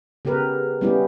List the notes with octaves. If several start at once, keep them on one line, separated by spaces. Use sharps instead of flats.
C#3 B3 G4 A#4 B4
G3 B3 C#4 E4 G4